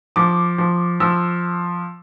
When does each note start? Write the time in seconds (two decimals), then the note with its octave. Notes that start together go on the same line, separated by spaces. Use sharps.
0.16 F3 D6
0.58 F3
1.00 F3 E6